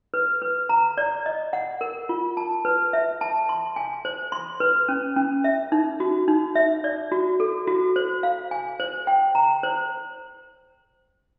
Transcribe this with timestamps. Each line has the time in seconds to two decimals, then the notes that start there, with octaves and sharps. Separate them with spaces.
0.14 B4
0.42 B4
0.69 A#5
0.98 D5
1.26 D#5
1.53 F#5
1.81 A#4
2.09 F4
2.37 A5
2.65 B4
2.93 E5
3.21 A5
3.49 C6
3.76 G#5
4.05 C5
4.32 C6
4.60 B4
4.89 C#4
5.16 C#4
5.44 E5
5.72 D#4
6.00 F#4
6.28 D#4
6.55 E5
6.84 D5
7.12 F#4
7.40 A4
7.67 F#4
7.96 C5
8.23 F5
8.51 G#5
8.80 C5
9.07 G5
9.35 A#5
9.63 C5